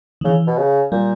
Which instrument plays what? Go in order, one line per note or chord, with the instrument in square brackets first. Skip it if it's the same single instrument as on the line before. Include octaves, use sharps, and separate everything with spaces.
[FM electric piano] D#3
[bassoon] C#3 [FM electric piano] E3
[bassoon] B2
C#3
[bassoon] A#2 [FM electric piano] G3